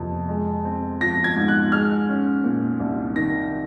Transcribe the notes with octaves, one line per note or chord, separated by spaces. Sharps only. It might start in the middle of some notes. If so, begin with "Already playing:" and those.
Already playing: F2 C3 A#3
G#3
C4
F3 A#6
G#6
G#2
F#6
G#3 F6
C#4
A#2
C2
D#3 A#6